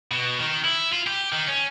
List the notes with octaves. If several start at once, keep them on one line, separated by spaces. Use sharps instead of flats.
B2
D#3
E4
F4
G4
D#3
C#4